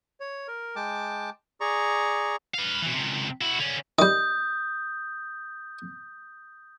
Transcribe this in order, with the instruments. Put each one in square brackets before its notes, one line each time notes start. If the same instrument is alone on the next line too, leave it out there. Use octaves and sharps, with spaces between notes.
[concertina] C#5
A#4
G#3 G5 A5 D6
G#4 D5 A#5 C#6
[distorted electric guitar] B4 F5
B2 E3
C#2 C3
E4 F#4
D3 C#4
[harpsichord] D#3 G3 [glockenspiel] D#6 G6